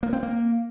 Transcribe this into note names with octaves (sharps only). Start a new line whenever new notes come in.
A#3
C4
A#3